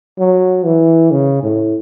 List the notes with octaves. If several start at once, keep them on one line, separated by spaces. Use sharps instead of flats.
F#3
E3
C#3
A2